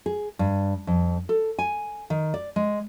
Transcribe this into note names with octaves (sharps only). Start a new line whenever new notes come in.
G#4
G2
F2
A4
G#5
D#3
D5
G#3